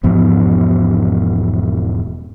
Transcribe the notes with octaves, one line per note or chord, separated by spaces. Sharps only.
E1 G#2 F3 B3